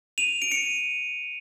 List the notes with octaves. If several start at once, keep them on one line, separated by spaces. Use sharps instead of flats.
D#7 F7
D7
C#7 D#7